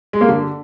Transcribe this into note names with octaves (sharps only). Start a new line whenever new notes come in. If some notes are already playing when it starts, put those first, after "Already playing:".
G#3
A#3
D3